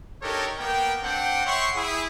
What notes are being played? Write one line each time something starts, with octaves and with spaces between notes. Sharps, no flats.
D4 D#4 G4 A4 A#4 C#5
A#3 B3 A#4 G5
C4 D4 F#5 G5
C#5 E5 F#5 G5 C6 C#6
E4 G#4